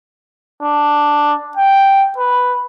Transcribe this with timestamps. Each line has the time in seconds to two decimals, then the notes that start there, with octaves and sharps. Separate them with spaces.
0.62 D4
1.57 G5
2.18 B4